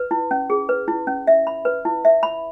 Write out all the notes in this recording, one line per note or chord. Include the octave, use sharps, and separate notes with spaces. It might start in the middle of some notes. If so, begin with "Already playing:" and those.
Already playing: B4
E4
C#4
G#4
B4
E4
C#4
E5
B5
B4
E4
E5
B5